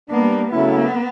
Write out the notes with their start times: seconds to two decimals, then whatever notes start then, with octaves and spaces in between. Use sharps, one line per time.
0.09 G3 A#3 B3 D4
0.51 C#3 F#3 A3 B3 C#4 E4